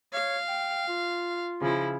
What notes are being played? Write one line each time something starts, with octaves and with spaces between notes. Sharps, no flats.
C#5 F5
G5
F4
C#3 F3 E4